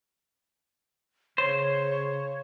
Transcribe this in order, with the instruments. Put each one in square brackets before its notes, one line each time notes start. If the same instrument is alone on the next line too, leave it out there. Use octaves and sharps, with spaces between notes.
[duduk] C#3 [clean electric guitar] C5 [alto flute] C#5